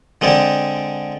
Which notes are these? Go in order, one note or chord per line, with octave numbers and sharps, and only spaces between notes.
D3 G#3 C4 D5